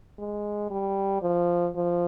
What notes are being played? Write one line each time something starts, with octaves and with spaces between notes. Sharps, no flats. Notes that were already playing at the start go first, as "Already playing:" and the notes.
G#3
G3
F3
F3